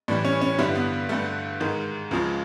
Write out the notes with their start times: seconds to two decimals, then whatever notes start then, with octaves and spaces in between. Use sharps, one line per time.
0.08 A2 E3 G3 D4
0.25 C#4
0.42 C#4
0.59 G2 D3 G3 E4
0.75 B3
1.09 G2 D3 G3 A3
1.60 G#2 D#3 G#3
2.11 C#2 C#3 F3 G#3